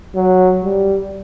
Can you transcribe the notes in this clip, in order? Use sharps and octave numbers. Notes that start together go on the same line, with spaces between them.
F#3
G3